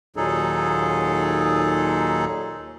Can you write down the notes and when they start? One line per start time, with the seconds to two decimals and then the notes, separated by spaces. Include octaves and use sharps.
0.16 D#2 A#2 F#3 D#4 G#4 A4